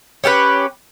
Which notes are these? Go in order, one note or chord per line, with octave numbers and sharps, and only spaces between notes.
C#4 G4 A4 B4